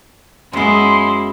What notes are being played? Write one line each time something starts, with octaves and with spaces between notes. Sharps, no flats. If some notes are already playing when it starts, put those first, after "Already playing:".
F#2 G#3 B3 E4 C6